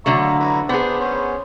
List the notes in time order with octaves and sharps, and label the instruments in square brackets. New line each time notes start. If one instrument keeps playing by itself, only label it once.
[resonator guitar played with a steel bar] D3 F#3 A3 [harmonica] E5 A#5 C#6
[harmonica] F5 A#5
E4 B4 A#5
[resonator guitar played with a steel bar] B3 G#4 [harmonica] D4 C5
[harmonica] C#4 C5